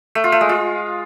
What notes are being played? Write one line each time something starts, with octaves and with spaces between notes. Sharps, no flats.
A3
F4
A3
G#3
F4